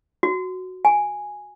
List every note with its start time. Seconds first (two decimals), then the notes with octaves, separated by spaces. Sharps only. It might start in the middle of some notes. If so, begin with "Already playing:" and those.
0.23 F#4
0.85 G#5